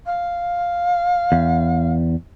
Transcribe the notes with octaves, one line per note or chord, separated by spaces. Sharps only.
F5
E2